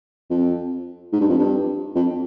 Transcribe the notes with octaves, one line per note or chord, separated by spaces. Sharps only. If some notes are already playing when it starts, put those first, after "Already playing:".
F2
G#2
G2
F2
G2
F2